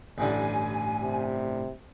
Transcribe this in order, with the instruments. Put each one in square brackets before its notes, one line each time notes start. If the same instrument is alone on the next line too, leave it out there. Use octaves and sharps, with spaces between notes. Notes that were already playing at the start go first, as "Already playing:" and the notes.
[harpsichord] A1 G2 D3 [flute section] G#5
[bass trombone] C3